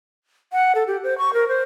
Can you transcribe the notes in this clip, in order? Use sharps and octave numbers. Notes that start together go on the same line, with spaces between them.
F#5
A4
G4
C5
C#6
A#4
C5